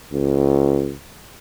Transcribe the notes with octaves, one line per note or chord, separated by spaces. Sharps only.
C#2